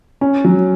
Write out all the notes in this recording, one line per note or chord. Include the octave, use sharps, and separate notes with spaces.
C#4
F#3